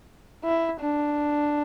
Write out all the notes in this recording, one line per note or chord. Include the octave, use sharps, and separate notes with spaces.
E4
D4